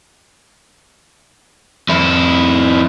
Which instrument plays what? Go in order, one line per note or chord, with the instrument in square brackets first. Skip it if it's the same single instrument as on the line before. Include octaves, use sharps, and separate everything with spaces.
[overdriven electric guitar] F2 E4